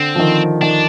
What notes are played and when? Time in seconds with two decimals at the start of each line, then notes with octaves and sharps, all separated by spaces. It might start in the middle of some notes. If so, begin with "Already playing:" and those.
Already playing: D3 C4
0.15 F3
0.19 D#3
0.61 D#3 D4